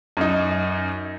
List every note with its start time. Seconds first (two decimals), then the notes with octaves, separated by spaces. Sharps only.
0.17 F#2 D#4